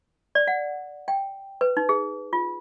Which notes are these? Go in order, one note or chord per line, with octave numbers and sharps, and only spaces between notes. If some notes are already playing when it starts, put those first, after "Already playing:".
D5
F#5
G5
B4
D#4
G#4
F4